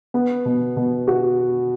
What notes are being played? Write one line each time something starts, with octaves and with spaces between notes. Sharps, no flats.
B3
B2
B2
F#4